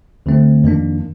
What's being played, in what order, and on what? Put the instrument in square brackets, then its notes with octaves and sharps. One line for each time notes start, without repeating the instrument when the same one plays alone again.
[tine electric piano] D2 D3 A3 C4
F2 D#3 A#3 D4